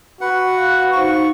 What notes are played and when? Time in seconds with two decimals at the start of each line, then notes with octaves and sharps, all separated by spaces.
0.21 F#4 B4 F#5
0.57 F5
0.93 D#4 C5 F5 C#6